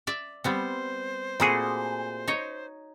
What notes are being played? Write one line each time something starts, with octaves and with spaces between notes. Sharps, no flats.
D5 E5
G3 B3 C4 C5
A#2 A3 C4 E4 F#4 G#4
D#4 C#5 D#5